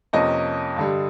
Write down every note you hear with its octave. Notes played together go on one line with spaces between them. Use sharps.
F2 C3 F3 A#3 C#4 D#5
G2 D3 G3